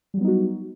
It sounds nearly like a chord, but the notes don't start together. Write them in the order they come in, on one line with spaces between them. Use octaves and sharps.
G3 F#3 B3 D#4 F#4